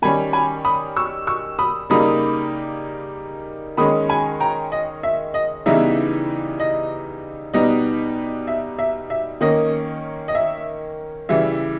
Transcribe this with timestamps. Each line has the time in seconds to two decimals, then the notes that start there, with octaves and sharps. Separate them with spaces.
0.02 D#3 G3 C#4 G#5 B5
0.33 G#5 B5
0.65 B5 D#6
0.97 C#6 E6
1.27 C#6 E6
1.59 B5 D#6
1.90 C#3 G3 A#3 D#4 B5 D#6
3.77 D#3 G#3 C#4 B5 D#6
4.09 G#5 B5
4.40 G5 A#5
4.72 D#5
5.03 E5
5.34 D#5
5.66 C#3 E3 G3 B3 D#4 E5
6.60 D#5
7.54 B2 G3 B3 D#4 D#5
8.47 E5
8.79 E5
9.10 E5
9.41 D#3 A#3 C#4 D#5
10.28 D#5
10.35 E5
11.29 C#3 E3 G3 E5